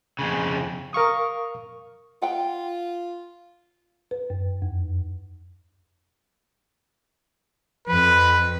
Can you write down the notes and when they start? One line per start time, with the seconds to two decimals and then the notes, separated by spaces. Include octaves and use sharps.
0.19 F2 C#3
0.93 A#4 F5 C#6 D#6
2.22 F4 F#5 G5
4.11 B4
4.30 F#2
4.62 F2
7.88 F2 B4